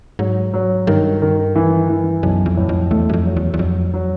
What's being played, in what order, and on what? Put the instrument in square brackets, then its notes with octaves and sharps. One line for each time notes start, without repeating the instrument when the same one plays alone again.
[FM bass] G#2 [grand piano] F#3
[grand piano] F#3
[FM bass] G2 [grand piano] D#3
[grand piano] D#3
E3
E3
[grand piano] B1 [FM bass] F#2
[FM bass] F2
[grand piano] A2
[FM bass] F2
[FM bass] E2 [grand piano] A3
[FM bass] F#2
F2
[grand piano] F#3
[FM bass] E2
E2
[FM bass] F2 [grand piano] F#3
[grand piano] F#3